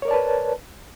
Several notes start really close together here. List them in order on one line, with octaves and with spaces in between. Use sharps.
C#5 A#4 D5 A5 B4